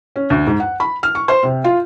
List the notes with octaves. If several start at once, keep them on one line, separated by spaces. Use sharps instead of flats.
C#4
D2
G#2
F#5
B5
F6
C#6
C5
C3
F4